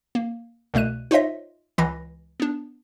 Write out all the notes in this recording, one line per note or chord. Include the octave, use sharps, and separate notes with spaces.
A#3
C2 B2 A3 F#6 D#7
D#4 F4 C5 C#5 D#5 E5
C#2 E3 B5 A#6
B3 D4